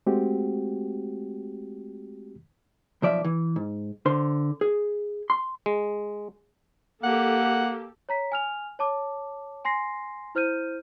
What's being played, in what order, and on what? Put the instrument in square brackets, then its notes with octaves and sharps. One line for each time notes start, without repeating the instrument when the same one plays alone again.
[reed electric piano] G#3 A3 C4 F#4 G4
[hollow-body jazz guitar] B1 F3 D5 E5
E3
G#2
D3 C5 C6
G#4
C6
[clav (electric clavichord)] G#3
[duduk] A#3 [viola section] G4 A4 [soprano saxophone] F#5
[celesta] C#5 A#5 B6
G#5 F6 F7
C#5 A5 D6
G#5 C6 A#6 C7
E4 C5 F6 G6 D#7